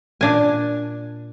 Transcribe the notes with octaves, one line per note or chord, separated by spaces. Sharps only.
A#2 D4 G#5